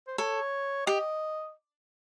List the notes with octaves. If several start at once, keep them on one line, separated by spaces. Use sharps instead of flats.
C5
A4 C#5
G4 D#5